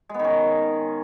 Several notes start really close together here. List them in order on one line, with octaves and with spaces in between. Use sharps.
G#3 B3 D#3 C#4